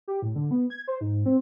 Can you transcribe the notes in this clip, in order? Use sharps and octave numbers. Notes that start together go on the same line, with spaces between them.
G4
A2
D3
B3
G#6
C5
G#2
C4